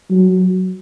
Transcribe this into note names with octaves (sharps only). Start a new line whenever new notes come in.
F#3